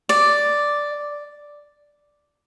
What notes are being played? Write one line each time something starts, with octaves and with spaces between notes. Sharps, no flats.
D5